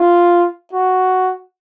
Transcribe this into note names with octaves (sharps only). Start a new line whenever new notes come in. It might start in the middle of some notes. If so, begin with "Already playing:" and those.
Already playing: F4
F#4